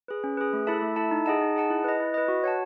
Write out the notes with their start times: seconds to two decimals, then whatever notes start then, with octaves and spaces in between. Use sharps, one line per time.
0.08 G#4 B4
0.24 C#4
0.37 G#4 B4
0.53 A3
0.67 E4 A4 E5 A5
0.82 A3
0.96 E4 A4 E5 A5
1.11 D#4
1.26 G#4 D#5 F#5 A5
1.41 D#4
1.56 G#4 D#5 F#5 A5
1.70 E4
1.84 B4 D#5
2.00 E4
2.14 B4 D#5
2.28 F#4
2.44 C#5 F#5 A5